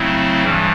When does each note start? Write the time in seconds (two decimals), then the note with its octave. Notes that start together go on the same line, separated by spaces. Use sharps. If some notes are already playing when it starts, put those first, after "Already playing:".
Already playing: C#3 F#3 A3 C4 E4
0.43 G2 E3 G3